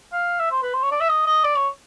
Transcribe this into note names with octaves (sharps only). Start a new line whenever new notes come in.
F5
E5
C5
B4
C5
C#5
D5
E5
D#5
D#5
D5
C#5